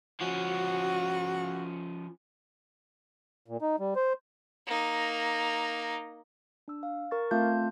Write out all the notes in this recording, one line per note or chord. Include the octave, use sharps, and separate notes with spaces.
F3 C#4 F#4
A#2
D#4
G3
C5
A#3 D#4
D4 E6
F5
A#4 C#6 A6
A3 C4 F4 F5 A5 G6